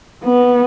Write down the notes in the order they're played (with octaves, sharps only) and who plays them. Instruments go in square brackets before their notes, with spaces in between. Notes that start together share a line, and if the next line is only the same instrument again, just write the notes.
[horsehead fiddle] B3